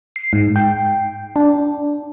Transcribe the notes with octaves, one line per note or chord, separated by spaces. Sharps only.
C7
G#2
G5
D4